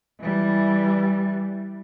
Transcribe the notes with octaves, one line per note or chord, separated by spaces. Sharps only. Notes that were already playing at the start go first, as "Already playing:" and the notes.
E3 G3